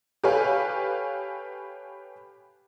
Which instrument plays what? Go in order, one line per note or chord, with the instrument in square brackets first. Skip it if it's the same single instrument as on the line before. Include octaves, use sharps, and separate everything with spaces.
[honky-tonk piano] G4 A4 B4 C#5 F5 G#5